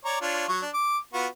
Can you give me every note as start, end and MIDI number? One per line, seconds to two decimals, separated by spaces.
0.05 0.18 73
0.05 0.18 74
0.05 0.18 82
0.21 0.47 62
0.21 0.47 65
0.21 0.47 73
0.48 0.61 54
0.48 0.61 85
0.62 0.70 62
0.74 0.98 86
1.14 1.27 59
1.14 1.27 65
1.14 1.27 66